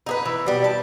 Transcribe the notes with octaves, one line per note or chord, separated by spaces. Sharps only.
D#4 G#4 B4
E3
B2 G3
A5